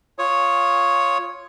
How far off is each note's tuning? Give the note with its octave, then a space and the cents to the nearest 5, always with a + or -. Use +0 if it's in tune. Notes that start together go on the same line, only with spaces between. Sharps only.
F4 +0 C#5 +0 D#6 +0